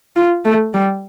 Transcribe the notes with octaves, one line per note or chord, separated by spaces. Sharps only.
F4
A3
G3